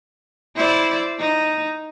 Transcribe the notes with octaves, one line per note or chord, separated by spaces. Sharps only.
E4 C5 D5
D#4